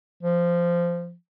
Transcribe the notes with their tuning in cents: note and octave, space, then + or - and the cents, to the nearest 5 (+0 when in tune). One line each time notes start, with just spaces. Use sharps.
F3 -15